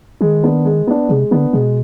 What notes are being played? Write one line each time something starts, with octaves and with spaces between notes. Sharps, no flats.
D#3 G#3
B3 D4
G#3
B3 D4
C3 G#3
D3 B3 D4
B2 G#3